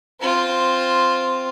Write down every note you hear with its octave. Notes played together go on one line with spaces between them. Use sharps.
C4 F4